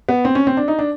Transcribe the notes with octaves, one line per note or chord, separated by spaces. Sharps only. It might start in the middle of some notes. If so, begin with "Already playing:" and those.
B3
C4
C#4
C4
D4
D#4
D4